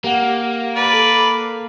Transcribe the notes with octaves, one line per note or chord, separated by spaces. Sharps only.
A#3 G4 F#5
B4 D5
A4